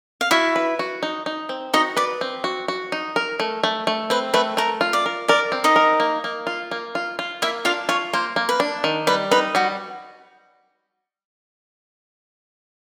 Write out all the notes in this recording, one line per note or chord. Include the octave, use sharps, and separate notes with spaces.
F5
E4 F#4 E5
B4
F#4
D#4
D#4
C4
D#4 F#4 D#5
B4 D5
C4
F#4
F#4
D#4
A#4
A3
A3
A3
C4 B4
A3 B4
A3 A#4
F4
D5
A#4
A#4 D5
C4
D#4 D#5
A#4
A#3
A#3
F4
A#3
F4
F4
A#3 E4 E5
D4 F4 F5
F4 C#5
A#3 C5
A#3
B4
D4
D#3
G3 B4
D#4 B4
G3 F#4